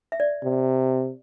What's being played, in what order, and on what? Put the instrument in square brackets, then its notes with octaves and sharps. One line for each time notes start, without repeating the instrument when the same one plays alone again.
[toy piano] E5
D5
[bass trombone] C3